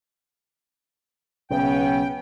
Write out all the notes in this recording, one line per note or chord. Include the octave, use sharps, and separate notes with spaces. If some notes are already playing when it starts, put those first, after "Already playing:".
B1 C#3 B3 C#4 G5